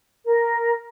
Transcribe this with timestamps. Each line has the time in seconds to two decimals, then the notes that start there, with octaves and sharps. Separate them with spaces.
0.24 A#4